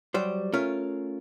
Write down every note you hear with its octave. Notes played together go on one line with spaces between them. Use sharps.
F#3 G3 C5
A3 C#4 F4 A#4